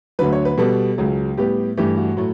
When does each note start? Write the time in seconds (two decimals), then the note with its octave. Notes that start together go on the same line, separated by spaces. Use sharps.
0.19 D2 D3 F#3 B4
0.32 C#5
0.45 B4
0.58 B2 G3 B3 A4
0.98 C#2 C#3 F#3
1.37 A2 G3 B3 G4
1.77 G2 E3 A3 G4
1.97 F#4
2.17 A2 F#3 A3